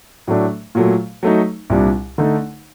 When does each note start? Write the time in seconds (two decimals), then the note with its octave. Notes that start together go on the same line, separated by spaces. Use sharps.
0.27 A2 F#3 A3 D4
0.75 A#2 F#3 A3
1.23 F#3 A3 D#4
1.70 C2 A#2 G3 D4
2.18 D3 A3 D#4